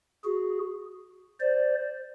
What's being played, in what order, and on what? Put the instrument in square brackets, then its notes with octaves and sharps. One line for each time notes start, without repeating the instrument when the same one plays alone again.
[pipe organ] F#4 G#4
C5 D5